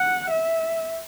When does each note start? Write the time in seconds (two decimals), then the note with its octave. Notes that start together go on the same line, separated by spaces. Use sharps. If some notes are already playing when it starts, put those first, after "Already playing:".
Already playing: F#5
0.31 E5